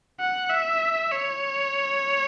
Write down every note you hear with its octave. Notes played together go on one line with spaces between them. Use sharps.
F#5
E5
C#5